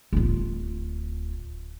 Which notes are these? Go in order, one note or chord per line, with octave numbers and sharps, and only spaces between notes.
D1 F4